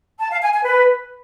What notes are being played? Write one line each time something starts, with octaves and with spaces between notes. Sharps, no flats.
A5
F5
G#5
G#5
B4